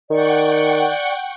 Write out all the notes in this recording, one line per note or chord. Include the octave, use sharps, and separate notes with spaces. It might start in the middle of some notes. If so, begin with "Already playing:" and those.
D#3 D5 F#5 G5 C#6